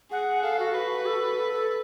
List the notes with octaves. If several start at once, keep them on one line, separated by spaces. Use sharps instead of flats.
G#4 F#5
A4 F5
F#4
F#4 B4
F#4
A4
A4
A4